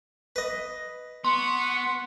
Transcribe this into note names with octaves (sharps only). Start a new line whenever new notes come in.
B4 D#5
B3 F#5 C6 C#6